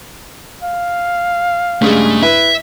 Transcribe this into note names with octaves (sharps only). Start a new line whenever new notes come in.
F5
G2 C#3 G#3 A3
E4 B4 E5